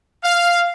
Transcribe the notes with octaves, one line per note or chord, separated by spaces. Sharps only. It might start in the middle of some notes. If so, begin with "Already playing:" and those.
F5